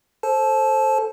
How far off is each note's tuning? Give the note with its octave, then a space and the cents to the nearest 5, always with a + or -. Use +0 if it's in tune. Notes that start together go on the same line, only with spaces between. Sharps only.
A4 +0 C5 +15 A5 -25